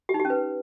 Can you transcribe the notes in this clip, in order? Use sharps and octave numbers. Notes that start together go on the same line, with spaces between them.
G4
D#4
G4
C#4
B4